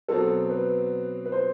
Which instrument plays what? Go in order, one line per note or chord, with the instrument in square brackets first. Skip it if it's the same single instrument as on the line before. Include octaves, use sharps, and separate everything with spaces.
[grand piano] B2 F#3 C4 [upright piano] A4
[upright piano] B4
B4
C5